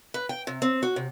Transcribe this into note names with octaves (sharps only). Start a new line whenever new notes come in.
B4
G5
C3
C4
F#4
C3